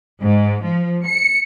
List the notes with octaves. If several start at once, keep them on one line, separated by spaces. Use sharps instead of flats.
G#2
F3
C#7